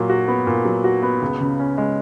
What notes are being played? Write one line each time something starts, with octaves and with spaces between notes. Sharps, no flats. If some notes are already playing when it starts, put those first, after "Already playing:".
Already playing: A#2 F#3
F#4
B3
A#2
F#3
F#4
B3
C#2
C#3
C#4
G#3